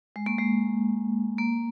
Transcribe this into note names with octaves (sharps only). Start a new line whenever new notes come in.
G#3
A#3
G#3
A#3